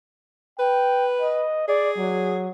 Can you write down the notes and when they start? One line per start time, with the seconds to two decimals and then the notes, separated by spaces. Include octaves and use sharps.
0.60 B4 G5
1.21 D#5
1.68 G#4 D5
1.98 F#3